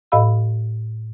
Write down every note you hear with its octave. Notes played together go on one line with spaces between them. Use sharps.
A2 A4 D#5 F5 B5 E6